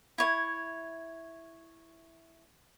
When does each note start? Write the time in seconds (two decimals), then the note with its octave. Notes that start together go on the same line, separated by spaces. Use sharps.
0.18 E4 C#5